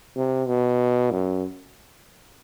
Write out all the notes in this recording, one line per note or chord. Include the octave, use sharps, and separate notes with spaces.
C3
B2
F#2